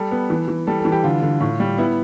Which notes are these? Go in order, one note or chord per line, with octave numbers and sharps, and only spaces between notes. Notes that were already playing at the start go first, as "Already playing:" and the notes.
Already playing: G3 A4
B3
E3
E3
G3 A4
A4
E3
G4
D3 F4
D3
A2
G3
B3 E4